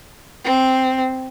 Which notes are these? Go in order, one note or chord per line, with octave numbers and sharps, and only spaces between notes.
C4